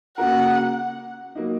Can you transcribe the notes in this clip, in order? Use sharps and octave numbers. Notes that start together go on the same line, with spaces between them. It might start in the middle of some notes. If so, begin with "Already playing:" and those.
C#3 A#3 F#4 A#4 F#5
F#3 A#3 D#4